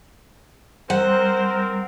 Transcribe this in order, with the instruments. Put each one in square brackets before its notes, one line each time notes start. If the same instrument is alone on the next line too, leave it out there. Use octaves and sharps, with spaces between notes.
[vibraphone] G3 [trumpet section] C4 A#4 [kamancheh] C5 [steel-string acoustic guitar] F#5